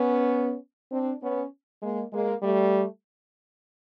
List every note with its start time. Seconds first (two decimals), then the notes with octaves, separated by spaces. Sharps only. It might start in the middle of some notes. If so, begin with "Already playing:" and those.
Already playing: B3 C#4
0.92 C4 D4
1.22 B3 C#4
1.82 G#3 A#3
2.13 G#3 A#3
2.42 G3 A3